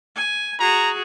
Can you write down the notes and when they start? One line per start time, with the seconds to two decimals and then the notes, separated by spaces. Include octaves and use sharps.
0.16 G#5
0.59 F#4 G#4 A#5